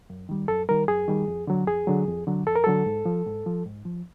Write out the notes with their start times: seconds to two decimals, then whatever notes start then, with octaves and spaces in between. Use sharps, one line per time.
0.10 F#2
0.29 D#3 G3
0.48 F#2 A4
0.69 D#3 G3 A#4
0.88 F#2 G#4
1.08 D#3 G3
1.28 F2
1.47 D3 F#3
1.67 F2 G#4
1.87 D3 F#3
2.08 F2
2.27 D3 F#3
2.47 F2 A4
2.55 A#4
2.64 D3 F#3 A4
2.86 G#2
3.05 F3
3.26 G#2
3.46 F3
3.66 G#2
3.85 F3